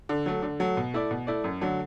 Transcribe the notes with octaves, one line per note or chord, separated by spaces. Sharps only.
D3
F#3 A3
D3
F#3 A3
B2
A3 E4 D5
B2
A3 E4 D5
F#2
D3 F#3 A3